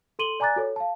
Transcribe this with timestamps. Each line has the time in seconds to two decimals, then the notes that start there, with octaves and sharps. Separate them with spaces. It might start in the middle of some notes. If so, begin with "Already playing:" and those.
0.19 A4 C6 D#7 F#7 G7
0.40 D5 G#5 A#5 D6 F#6 A6
0.56 F#4 A4 C#5
0.76 F5 A5